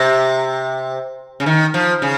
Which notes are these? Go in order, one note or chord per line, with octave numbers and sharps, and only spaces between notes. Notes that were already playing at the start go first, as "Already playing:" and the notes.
Already playing: C3
C#3
D#3
F3
C#3